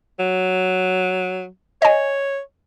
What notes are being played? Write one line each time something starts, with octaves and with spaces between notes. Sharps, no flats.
F#3
C#5 D#5 G#5